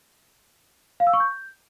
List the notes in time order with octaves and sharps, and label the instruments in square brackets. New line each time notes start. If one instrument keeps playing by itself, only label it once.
[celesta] F5
E6
C#6
G6